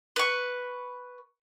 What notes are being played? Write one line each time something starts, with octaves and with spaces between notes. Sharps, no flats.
B4 C#6